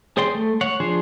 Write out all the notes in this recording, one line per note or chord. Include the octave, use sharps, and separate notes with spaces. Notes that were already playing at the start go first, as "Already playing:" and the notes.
G#4 C5 D5 G5 C6
A3
C#5 F#5
F3 D4 G#4 C5